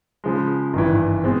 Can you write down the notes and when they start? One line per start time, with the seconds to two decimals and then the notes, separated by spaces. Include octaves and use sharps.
0.24 C#3 F3 G#3
0.73 G#1 G2 E3
1.24 B2 G#3 C4